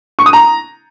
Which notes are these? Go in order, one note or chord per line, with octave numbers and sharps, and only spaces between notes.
C#6
D#6
A#5